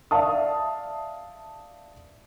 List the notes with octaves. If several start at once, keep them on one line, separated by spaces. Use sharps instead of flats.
D5 E5 F5 A5 D#6